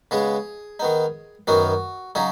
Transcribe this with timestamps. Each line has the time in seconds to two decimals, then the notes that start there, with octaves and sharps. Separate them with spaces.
0.11 C#3 G#3 B3 G#4
0.80 D#3 B3 D#4
1.47 F#2 D#3 B3 D#4 F#4
2.15 C#3 F#3 D#4 G#4